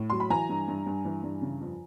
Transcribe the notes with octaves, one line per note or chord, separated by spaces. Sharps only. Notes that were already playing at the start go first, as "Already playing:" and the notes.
Already playing: A2
F#3 C6
B5
E3 G#5 A#5
G2
G2
G2
E3
G2
C#3
F2